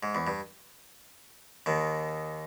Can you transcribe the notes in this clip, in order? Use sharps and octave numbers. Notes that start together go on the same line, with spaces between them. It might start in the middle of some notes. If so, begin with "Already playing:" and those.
G#2
E2
G2
D#2 D#3